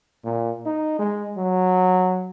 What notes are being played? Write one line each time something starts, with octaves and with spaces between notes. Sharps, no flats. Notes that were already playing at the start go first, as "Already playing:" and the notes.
A#2
D#4
G#3
F#3